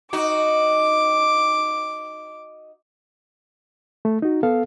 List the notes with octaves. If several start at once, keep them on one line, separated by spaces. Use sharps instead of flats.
D#4 F#4 D6
A3
D#4 F#4
B3 A4 F5